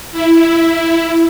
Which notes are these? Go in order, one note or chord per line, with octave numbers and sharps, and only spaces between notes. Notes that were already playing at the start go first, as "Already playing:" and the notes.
E4